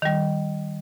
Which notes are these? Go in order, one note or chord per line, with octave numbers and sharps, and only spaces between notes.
D#3 G3